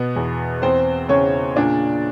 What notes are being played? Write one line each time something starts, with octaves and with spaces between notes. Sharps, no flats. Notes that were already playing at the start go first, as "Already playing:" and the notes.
Already playing: B2 B3
E2
E2 C4 C5
C#3 C#4 C#5
A#2 D4 D5